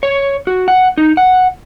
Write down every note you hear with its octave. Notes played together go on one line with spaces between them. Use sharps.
C#5
F#4
F#5
D#4
F#5